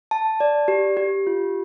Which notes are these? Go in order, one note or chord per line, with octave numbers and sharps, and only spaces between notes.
A5
D5
G4
G4
F4